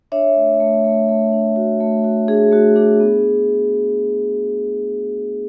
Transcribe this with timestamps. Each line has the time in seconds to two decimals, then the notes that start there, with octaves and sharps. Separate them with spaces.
0.12 D4 C#5 E5
0.36 A3
0.60 A3
0.84 A3
1.09 A3
1.33 D4
1.56 F#4
1.80 A3
2.04 F#4
2.28 D4 G#4
2.52 A3 F#4
2.76 D4 G#4
3.00 B3